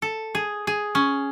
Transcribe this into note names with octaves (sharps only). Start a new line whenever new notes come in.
A4
G#4
G#4
C#4